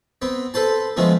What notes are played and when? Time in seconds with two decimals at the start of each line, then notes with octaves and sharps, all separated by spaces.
0.22 B3 C4
0.54 A4 B4 C5 A5
0.97 D3 F3 G#3 A3 B3